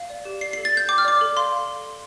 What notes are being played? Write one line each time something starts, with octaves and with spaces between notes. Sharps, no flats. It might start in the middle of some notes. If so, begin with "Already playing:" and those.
Already playing: F5
D5
G4
D5 C7
A4 C7
A6
A4 G6
G5 D6
F6
D5 D6
A4
F5 C6
F5